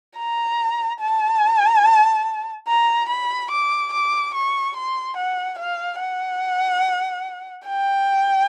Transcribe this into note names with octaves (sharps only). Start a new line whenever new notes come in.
A#5
A5
A#5
B5
D6
D6
C#6
C6
F#5
F5
F#5
G5